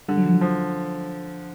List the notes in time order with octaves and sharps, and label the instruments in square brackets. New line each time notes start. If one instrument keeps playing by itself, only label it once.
[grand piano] D3 [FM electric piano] G3
[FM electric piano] F#3
F3
F#3
[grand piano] F3